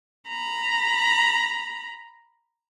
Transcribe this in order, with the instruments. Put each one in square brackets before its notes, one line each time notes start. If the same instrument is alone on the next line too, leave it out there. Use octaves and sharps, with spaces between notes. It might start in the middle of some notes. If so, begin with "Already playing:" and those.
[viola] A#5 B5